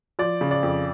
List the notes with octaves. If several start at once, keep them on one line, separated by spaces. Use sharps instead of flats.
F3 D5
C#3
D5
F2